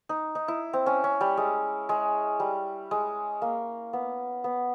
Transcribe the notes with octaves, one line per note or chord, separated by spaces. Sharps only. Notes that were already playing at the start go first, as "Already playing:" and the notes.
D#4
D#4
E4
C4
C#4
C#4
G3
G#3
G#3
G3
G#3
A#3
B3
B3